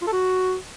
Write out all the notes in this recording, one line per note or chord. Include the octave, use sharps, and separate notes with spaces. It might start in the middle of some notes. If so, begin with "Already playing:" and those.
F4
A4
F#4